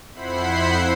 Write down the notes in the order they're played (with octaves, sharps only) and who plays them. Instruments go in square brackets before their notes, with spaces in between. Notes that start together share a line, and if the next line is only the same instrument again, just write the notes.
[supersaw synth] F2 E4 C5 F#5 B5 C7